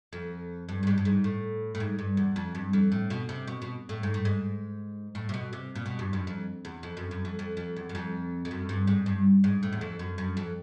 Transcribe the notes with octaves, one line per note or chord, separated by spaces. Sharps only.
F2
G2
G2
G#2
G2
G#2
A2
A2
G#2
G2
E2
F2
G2
F2
A2
B2
C3
B2
B2
A2
G#2
A2
G#2
A2
C3
B2
C3
A#2
B2
G2
F#2
F2
E2
F2
F#2
F#2
F2
F2
F2
E2
F#2
F2
F2
F#2
G2
G#2
G2
G#2
A2
E2
F2
F#2
F#2
F2